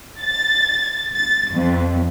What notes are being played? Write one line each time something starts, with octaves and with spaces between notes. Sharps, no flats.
A6
A6
F2